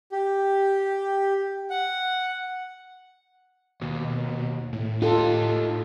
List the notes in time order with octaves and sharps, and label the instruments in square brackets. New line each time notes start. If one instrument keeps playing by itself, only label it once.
[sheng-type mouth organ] G4
F#5
[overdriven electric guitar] D#2 [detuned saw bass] B2
[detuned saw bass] A2
[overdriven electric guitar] D#4 G4 [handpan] F4 A4